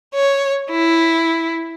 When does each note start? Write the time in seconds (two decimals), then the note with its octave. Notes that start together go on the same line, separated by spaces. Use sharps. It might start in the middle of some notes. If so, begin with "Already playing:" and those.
0.15 C#5
0.70 E4